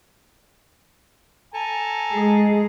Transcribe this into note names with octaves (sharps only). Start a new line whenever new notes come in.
A4 G#5 A#5
G#3 G#4